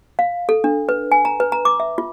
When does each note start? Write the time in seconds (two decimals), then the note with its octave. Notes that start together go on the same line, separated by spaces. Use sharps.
0.19 F5
0.49 A4
0.64 D4
0.89 B4
1.12 G#5
1.25 A#5
1.40 B4
1.52 A#5
1.65 D6
1.80 E5
1.98 F4